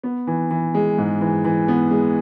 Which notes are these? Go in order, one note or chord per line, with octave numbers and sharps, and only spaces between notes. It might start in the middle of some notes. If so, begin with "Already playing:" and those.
B3
E3
E3
G#3
G#2
E3
E3
B3
G#3